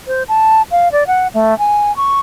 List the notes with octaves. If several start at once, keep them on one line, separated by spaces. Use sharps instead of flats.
C5
A5
F5
D5
F#5
A3
G#5
C#6